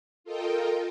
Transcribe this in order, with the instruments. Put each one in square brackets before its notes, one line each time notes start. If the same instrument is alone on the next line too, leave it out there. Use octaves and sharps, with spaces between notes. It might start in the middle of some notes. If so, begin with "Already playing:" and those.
[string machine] F4 A4 A#4 D#5 G5